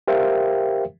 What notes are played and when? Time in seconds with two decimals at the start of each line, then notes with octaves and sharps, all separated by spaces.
0.08 G4 A#4 C5 E5 F5 G5